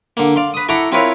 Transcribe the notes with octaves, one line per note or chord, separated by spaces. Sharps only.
D3 A#3
D5 F5 C6
B4 D#6
E4 A4 F#5 A#5 C#6 D6
C4 E4 F4 A#4 B4 C#5